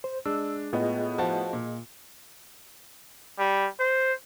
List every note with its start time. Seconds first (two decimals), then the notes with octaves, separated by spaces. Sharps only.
0.04 C5
0.26 G#3 D4 E6
0.73 A2 B3 F4 G#4 D#5
1.18 F3 F#4 A5
1.53 A#2
3.39 G3
3.80 C5